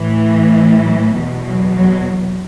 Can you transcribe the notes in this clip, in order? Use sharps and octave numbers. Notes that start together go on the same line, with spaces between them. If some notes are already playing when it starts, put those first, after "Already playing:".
Already playing: A2 E3
F#3
E2 B2 E3
F#3
F#3